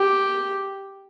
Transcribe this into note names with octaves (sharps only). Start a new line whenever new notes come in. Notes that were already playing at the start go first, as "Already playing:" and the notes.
Already playing: G4